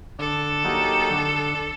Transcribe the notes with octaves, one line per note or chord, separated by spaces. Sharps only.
D3 A4
F#3 A#3 D#4 G4
D3